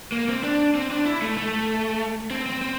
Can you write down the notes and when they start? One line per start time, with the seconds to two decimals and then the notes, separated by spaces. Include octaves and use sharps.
0.12 A#3
0.29 C4
0.43 D4
0.75 C4
0.91 D4
1.06 E4
1.22 A3
1.37 A3
2.31 C4
2.46 C4
2.62 C4